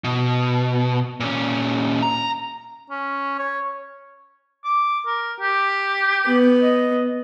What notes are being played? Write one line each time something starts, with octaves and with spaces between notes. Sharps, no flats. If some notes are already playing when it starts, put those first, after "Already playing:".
B2
A#2 C#4
A#5
C#4
C#5
D6
A#4
G4
B3
D#5